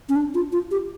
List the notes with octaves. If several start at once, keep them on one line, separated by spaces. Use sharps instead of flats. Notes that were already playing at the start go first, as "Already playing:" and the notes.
C#4
D4
F4
F4
G4